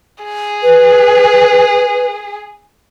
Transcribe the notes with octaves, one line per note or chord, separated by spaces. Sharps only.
G#4
B4